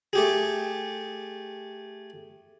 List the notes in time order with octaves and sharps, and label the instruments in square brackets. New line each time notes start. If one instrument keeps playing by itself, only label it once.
[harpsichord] A3 G4 G#4